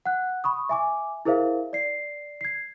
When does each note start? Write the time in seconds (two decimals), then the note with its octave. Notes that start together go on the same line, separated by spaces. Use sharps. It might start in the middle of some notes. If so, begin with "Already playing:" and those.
0.06 F#5 F#6
0.44 B5 C#6 D#6
0.69 E5 G#5 D6
1.25 E4 G#4 A#4 C5 E5 F5
1.73 D5 C7
2.41 G#6 C7